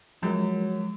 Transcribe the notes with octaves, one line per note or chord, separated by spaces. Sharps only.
F#2 F3 F#3 G#3 A#4